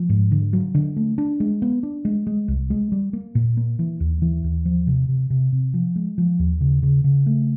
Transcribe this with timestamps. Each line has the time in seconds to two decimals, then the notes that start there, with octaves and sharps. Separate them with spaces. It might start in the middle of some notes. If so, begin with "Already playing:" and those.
Already playing: F3
0.09 G#2
0.31 D3
0.53 F#3
0.75 D3
0.96 A3
1.18 D4
1.40 G#3
1.62 B3
1.83 D4
2.05 G#3
2.27 G#3
2.48 C2
2.70 G#3
2.92 G3
3.13 A#3
3.35 A#2
3.57 A#3
3.79 E3
4.00 D#2
4.22 E3
4.44 D#2
4.65 F3
4.87 C3
5.09 C3
5.30 C3
5.52 C3
5.74 F3
5.96 G#3
6.18 F3
6.39 D#2
6.61 C#3
6.83 C#3
7.04 C#3
7.26 A3